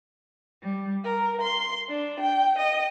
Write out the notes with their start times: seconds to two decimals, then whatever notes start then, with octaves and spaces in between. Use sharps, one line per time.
0.62 G3
1.03 A#4
1.41 C6
1.88 D4
2.20 G5
2.58 D#5